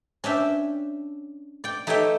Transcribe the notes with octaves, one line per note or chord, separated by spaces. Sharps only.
C#4 D4 E5 G5
D5 G5
A3 D#4 G4 C#5 E5 G5